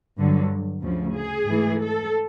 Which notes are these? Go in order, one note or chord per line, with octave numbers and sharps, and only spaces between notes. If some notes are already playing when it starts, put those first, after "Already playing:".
G2 D3 F#3
D2 C#3 F3
G#4
G#2 E3 A3
A4